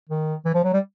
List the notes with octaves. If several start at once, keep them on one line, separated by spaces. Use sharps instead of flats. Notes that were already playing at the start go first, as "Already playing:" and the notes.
D#3
E3
F3
F#3
G3